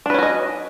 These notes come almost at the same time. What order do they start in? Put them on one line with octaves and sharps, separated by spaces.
D4 B4 C#4 F#4 D#5